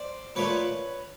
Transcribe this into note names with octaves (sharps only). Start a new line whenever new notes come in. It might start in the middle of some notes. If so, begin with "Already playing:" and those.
Already playing: C5 D5
A#2 F3 A3 B4 C#5